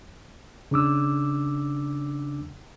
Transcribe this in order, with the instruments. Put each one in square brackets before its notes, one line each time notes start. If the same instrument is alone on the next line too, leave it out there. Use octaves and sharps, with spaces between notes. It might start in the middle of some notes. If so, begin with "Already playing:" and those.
[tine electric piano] C#3 D4 D6 E6